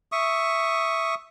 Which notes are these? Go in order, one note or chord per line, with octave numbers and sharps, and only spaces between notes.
E5 C#6 D#6